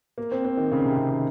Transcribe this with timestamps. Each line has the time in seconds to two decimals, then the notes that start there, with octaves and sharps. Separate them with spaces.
0.18 A#3
0.32 C4
0.45 C4
0.57 D#3
0.72 C#3
0.85 C3
0.97 C#3
1.11 D#3